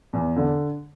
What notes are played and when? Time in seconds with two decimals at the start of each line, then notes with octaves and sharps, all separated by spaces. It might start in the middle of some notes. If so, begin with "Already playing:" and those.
0.13 E2
0.36 D3